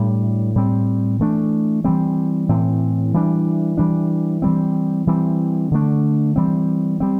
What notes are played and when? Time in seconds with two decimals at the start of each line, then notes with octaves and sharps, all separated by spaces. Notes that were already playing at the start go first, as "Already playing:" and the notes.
Already playing: A2 G3 D4
0.56 A2 G3 C4
1.19 E3 A3 D4
1.84 E3 G3 C4
2.49 A2 E3 C4
3.14 E3 G3 D4
3.77 E3 G3 D4
4.42 E3 G3 C4
5.07 E3 G3 C4
5.71 D3 A3 D4
6.36 E3 G3 C4
7.00 G3 C4